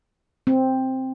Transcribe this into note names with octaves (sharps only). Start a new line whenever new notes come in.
C4